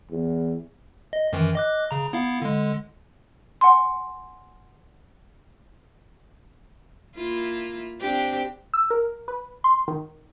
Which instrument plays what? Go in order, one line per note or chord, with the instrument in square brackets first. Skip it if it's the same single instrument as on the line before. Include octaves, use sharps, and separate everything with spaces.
[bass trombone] E2
[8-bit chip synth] D#5
F#2 D#3 E3
D#5 D6 F#6
C#3 A#5
B3 E4 F5
D3 G#3
[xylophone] F#5 G#5 C6
[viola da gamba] A#3 E4 F4
C4 D4 G4
[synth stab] E6
A#4
B4
C6
D#3